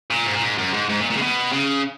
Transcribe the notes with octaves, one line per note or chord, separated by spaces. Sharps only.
A#2
G#2
A#2
G#2
F#2
G#2
G#2
A#2
A#2
C#3
B2
C#3